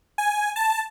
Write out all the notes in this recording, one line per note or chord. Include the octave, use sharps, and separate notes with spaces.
G#5
A5